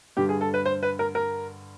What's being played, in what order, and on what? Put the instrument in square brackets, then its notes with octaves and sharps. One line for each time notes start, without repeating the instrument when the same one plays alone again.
[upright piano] G2 D3 G3 [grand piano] G4
[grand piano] G#4
A4
B4
C5
B4
A#4
A#4